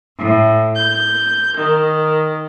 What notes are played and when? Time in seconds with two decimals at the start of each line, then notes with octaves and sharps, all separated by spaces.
0.17 A2
0.75 G6
1.57 D#3